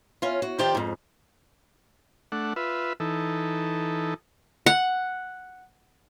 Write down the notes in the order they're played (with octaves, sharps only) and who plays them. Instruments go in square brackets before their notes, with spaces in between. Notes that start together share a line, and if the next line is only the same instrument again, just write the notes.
[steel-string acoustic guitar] C#4 F4
F#4
D#3 F3 G4 C5 D5 G5
F2 G#2
[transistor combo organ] A3 D4 F#5
F4 B4 E5
E3 D#4 A4
[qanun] F#5